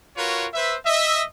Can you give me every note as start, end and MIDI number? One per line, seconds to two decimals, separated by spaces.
0.17 0.46 65
0.17 0.46 66
0.17 0.46 70
0.17 0.46 71
0.17 0.46 73
0.54 0.75 71
0.54 0.75 72
0.54 0.75 76
0.86 1.24 75
0.86 1.24 76